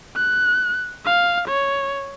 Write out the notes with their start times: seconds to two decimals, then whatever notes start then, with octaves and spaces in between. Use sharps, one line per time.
0.16 F#6
1.06 F5
1.48 C#5